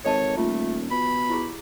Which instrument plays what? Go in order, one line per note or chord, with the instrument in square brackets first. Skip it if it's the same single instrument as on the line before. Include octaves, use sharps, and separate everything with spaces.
[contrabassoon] G#1 [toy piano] A4 D#5 A5 [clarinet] C#5
[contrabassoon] D#1 [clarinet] A3 [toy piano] F4
[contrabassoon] B2 [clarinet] B5
[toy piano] E4 G4 G#4